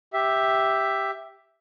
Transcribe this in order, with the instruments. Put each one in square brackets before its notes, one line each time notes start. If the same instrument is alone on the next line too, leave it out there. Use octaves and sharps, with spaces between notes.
[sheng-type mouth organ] G4 E5